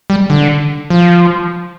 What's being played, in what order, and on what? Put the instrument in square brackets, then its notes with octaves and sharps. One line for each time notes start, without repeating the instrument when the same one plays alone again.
[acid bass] G3
D3
F3